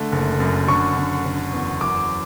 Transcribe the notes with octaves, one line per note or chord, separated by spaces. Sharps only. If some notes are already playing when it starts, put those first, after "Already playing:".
Already playing: D3 A3
F#1
F#2
D3 C#6
D3
D3
E2
F#2 D6